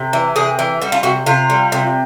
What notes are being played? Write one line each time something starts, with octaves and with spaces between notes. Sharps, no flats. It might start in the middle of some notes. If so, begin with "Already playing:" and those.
Already playing: C3
E3
C3 G#4
E3
G3 F#4
F4
C3 F#4
C3 F4
G3
C3